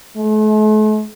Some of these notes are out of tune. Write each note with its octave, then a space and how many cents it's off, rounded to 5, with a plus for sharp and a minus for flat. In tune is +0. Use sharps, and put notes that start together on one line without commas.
A3 -45